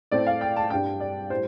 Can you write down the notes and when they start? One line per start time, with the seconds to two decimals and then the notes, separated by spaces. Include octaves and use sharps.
0.12 A2 A3 C4 D5
0.27 F5
0.41 G5
0.56 A5
0.70 G2 G3 D4 G5
1.00 D5
1.30 A2 G3 C5